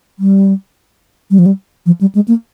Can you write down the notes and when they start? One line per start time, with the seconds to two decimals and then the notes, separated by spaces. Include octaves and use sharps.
0.19 G3
1.31 G3
1.39 F3
1.46 G3
1.86 F3
2.01 G3
2.15 G#3
2.28 A#3